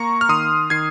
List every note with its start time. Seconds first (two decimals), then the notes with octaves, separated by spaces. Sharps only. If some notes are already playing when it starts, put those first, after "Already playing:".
Already playing: A#3 A#5 C#6
0.21 F6
0.29 D#3 C6 D#6
0.70 D#3 G#6 C7